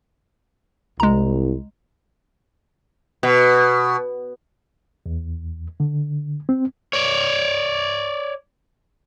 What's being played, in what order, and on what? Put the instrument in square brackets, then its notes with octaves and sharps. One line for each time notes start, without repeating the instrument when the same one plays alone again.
[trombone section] C2 [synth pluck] G#3 A#5
[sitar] B2
[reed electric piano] E2
D3
C4
[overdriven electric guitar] C#5 D5